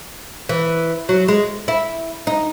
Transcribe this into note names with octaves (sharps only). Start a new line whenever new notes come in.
E3
F#3
G#3
E4
D#4